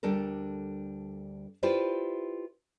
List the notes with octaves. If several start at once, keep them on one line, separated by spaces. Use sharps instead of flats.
D2 G3 D4 A4 A#4
E4 F4 G4 B4 C5 D5